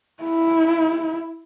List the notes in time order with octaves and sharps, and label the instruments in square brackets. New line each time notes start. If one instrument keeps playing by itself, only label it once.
[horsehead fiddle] E4